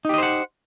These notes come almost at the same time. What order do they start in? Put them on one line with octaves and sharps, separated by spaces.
D#4 G4 D#5 C5 F#5